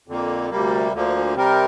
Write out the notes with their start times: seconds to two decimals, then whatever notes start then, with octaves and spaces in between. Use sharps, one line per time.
0.08 F2 D3 A#3
0.50 D2 C3 G3 A#3
0.92 D2 D3 F3 A#3
1.35 C3 G3 C4 A#4